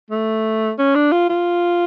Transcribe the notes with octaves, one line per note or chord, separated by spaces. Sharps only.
A3
C#4
D4
F4
F4